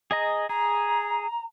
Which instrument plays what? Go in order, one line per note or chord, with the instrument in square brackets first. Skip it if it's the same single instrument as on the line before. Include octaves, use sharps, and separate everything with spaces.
[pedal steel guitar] G#4 D#5 A#5
[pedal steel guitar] G#4 [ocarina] A#5